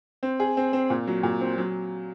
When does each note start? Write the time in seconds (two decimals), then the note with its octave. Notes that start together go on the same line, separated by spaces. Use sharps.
0.23 C4
0.40 G#4
0.57 C4
0.73 C4
0.90 A#2
1.07 F#3
1.23 A#2
1.41 C4
1.58 F#3